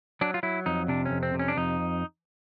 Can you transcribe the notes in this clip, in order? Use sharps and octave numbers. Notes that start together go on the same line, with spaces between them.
F#3 D4
F4
F#3 E4
F2 D#4
C3 D4
C#4
F2
C4
C3
C#4
D4
F2 D#4